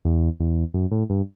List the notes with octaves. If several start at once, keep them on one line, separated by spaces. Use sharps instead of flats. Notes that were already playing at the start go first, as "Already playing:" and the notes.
E2
E2
F#2
A2
G2